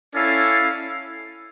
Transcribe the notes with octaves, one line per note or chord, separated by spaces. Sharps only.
C#4 E4 A4 D5 F5